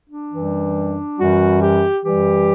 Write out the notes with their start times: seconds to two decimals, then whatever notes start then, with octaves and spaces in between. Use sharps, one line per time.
0.10 D4
0.31 F#2 E3 G3
1.17 F#2 E3 G3 F#4
1.61 G4
2.04 F#2 E3 G3 G4